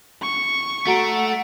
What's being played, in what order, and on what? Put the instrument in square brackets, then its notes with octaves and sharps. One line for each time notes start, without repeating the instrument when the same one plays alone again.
[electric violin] C#6
[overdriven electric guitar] A3 [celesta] F#4 A#5 D7 [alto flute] F#5